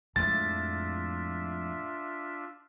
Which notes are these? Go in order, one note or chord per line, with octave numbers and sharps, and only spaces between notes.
F2 A2 G#3 D4 F4 E5 A6